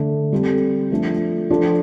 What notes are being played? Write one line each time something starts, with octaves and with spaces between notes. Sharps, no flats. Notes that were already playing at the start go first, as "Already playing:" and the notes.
Already playing: D3 A3 D4
G3 C4 A4
F3 A3 D4 A4
F3 D4 F4 A4